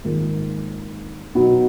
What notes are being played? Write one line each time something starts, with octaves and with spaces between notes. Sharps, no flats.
G#1 G#2 D#3 A#3 F4
B2 F#3 B3 D#4 F#4